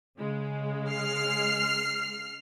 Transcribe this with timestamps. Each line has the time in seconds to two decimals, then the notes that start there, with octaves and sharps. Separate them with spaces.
0.18 C#3 G#3
0.90 F6 C7